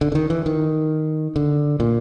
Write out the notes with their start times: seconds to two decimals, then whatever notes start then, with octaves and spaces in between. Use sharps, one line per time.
0.01 D3
0.12 D3
0.15 D#3
0.30 E3
0.46 D#3
1.36 D3
1.80 A#2